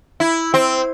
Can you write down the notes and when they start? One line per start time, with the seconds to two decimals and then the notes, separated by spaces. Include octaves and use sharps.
0.20 E4
0.54 C4